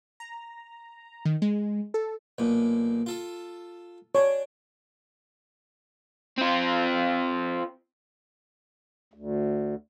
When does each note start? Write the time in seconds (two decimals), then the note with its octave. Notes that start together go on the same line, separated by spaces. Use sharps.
0.20 A#5
1.25 D#3
1.42 G#3
1.94 A4
2.38 B1 A#2
3.06 F4 A4
4.15 D4 C#5
6.38 C4 F4
9.14 D2